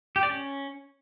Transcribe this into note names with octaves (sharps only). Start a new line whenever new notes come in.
G4
D5
C#4